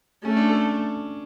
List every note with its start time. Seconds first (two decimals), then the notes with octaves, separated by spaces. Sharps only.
0.25 A3 C#4
0.37 D4
0.49 A4